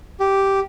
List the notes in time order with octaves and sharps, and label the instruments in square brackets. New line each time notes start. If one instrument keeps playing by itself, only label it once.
[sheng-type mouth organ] G4